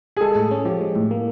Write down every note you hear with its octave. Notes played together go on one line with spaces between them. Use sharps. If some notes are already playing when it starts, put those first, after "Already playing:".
G#4
G#3 A4
A2
C#4
F3 G4
G#3
A2
A#3